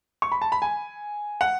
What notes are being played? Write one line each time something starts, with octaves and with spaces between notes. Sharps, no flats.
C#6
B5
A5
B5
G#5
F#5